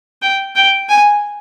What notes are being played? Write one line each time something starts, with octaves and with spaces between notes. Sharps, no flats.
G5
G5
G#5